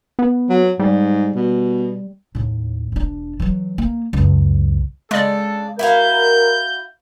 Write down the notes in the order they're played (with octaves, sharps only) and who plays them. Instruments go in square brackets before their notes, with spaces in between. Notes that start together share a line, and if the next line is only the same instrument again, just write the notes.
[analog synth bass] B3
[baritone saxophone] F#3
[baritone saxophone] G#2 [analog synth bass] G3
[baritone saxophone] B2
[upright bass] D#2 A2
E1 D4
E3 F#3
A#3
C#2 F#2
[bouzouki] C#3 D4 [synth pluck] G#3 D5 [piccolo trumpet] A4
[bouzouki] E4 F#4 F5 [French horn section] A#4 [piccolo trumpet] G6